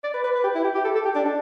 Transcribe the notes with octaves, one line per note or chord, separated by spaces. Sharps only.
D5
B4
B4
B4
G4
E4
G4
G4
A4
A4
G4
D4
D4